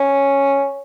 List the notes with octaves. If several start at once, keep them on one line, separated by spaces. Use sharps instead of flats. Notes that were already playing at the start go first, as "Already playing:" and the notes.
Already playing: C#4